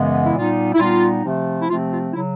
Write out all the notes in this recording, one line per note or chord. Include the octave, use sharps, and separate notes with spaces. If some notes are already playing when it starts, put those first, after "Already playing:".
Already playing: F#2 C#3 E3 G#3 B3
E4
A#2 G3 B3 D#4 F4
E4
A#2 G3 B3 D#4 F4
C3 F3 A3 C4
E4
C3 F3 A3 C4 F4
F4
C#3 F#3 E4